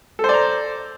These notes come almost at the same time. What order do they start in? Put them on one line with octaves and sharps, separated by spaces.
A4 C5 D5 A#5